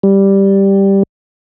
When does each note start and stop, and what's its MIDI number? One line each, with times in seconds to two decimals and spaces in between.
0.03 1.03 55